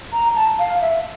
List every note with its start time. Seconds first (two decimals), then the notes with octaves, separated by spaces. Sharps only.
0.13 A#5
0.35 A5
0.59 F5
0.81 E5